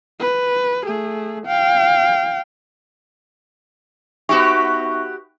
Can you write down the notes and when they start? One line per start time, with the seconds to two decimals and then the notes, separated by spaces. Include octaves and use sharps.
0.20 B4
0.84 A3 G#4
1.46 F5 G5
4.29 B3 D#4 F#4 G4 E5 C#6